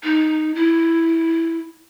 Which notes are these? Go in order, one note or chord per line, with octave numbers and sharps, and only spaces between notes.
D#4
E4